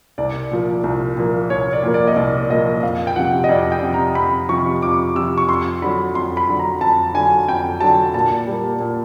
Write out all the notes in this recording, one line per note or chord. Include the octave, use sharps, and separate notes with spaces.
C2 D5
A#2 F3 A#3
C2
A#2 F3 A#3
C2 C#5
D5
A#2 F3 A#3
D5
D#5
C2 D5
A#2 F3 A#3 D#5
F2 F5
G5
C3 F3 F#5
D#5
F2 D5
G5
C3 F3
A#5
F2 B5
C3 F3 C#6
F2 D6
C3 F3 E6
C#6
F2 C6
D3 F#3 B5
F2 C6
B5
D3 F#3
A#5
F2 A5
D3 F#3 G#5
F2 G5
D3 F#3 A5
A#2 A5
G3
A#3
A#2